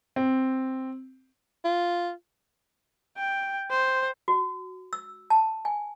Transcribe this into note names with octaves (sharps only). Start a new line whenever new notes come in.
C4
F4
G5
C5
F#4
E6
A5
G#5